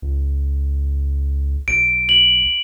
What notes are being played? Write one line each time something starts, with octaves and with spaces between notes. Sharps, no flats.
C#2
B1 D7
F#7